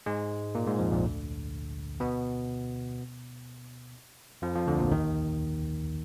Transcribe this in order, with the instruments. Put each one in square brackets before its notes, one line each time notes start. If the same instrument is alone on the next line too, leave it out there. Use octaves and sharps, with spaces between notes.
[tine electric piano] G#2 G#3
A#2 A#3
G#2 G#3
F2 F3
A#1 A#2
D2 D3
B2 B3
F2 F3
F2 F3
D2 D3
A#1 A#2
D#2 D#3